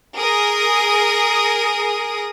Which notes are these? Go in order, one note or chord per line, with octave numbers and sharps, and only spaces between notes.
G#4 A#4 D#6